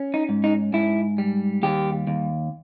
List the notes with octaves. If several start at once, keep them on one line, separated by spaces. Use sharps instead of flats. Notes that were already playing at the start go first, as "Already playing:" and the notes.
Already playing: C#4
D#4
G#2
D#4
G#2 E4
G3
D#2 G4
D#2